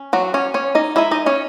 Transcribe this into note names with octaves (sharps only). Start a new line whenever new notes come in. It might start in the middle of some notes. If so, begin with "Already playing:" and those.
Already playing: C#4
F#3 F#4
C#4 C#5
C#4 C#5
D#4 D#5
G#3 D#4 E4 E5
D#4 D#5
C#4 C#5